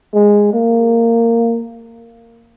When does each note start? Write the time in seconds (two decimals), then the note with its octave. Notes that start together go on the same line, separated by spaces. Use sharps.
0.14 G#3
0.53 A#3